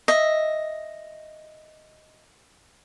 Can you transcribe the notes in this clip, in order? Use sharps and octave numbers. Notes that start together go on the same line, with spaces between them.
D#5 E5